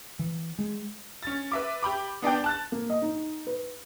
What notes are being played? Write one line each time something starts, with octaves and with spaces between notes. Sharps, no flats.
E3
G#3
C#4 A6
B4 E5 D6
G4 B5 D6
B3 D4 D5 G5
A5 F#6 A6
A#3
D#5
D#4
B4